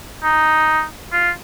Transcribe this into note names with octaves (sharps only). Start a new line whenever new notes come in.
D#4
F4